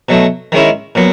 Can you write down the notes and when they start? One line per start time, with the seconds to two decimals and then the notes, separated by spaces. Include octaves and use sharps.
0.09 B2 F#3 A3
0.52 D#3 G#3 C#4 E4
0.95 A#2 F#3 B3